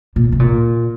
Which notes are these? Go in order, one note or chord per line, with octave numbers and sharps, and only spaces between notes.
A#2
C3
A#2